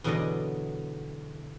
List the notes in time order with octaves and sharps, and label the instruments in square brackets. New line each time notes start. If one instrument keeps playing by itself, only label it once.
[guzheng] E2 B2 D3 F#3 D5 D#5